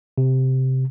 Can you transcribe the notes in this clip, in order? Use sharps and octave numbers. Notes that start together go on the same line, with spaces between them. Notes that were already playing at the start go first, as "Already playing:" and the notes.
C3